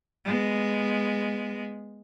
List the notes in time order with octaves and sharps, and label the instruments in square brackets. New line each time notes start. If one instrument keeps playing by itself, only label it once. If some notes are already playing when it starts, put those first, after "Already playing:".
[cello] G#3 B3